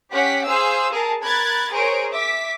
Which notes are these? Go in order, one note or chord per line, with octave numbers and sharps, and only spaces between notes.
C#4 G4 F#5 B6
G#4 C5 F5 E6
G#4 A#4 A5
A#4 B5 F#6 G#6 A6
G#4 A#4 C5 C#5 D7
E5 D6 B6